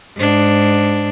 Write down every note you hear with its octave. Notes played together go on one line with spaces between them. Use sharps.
G#2 D4